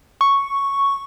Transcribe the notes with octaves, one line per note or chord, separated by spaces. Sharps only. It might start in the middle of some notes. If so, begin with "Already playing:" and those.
C#6